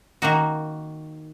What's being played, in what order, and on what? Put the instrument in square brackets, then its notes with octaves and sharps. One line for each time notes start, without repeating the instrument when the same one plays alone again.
[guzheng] D#3 A#3 D#4 F#4